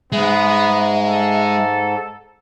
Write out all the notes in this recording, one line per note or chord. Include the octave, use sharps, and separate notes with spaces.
G#2 G#3 B3 E5
A4